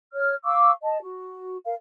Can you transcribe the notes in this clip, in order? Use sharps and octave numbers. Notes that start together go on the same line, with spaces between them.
C#5 F6
F5 C#6 D6 E6
D#5 A5
F#4
A#4 F5